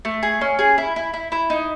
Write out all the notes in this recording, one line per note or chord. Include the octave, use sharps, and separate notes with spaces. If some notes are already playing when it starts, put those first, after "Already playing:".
A3
G#4
C#4
G#4
E4
E4
E4
E4
D#4